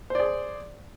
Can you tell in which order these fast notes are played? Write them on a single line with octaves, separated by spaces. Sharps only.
C5 D5 G#4